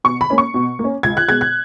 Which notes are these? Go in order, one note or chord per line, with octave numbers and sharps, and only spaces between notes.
B2 C#6
B5
A#3 C#4
C#6
B2
A#3 C#4
C#2 G#6
F#6
B2 G#3 G#6
F#6